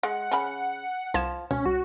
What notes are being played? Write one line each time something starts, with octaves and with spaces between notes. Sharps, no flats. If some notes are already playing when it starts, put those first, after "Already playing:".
G#3 F#5
C#3 B5
C2 F3 G#6 E7
C#2 B2 C#4 C#5
C2 F#4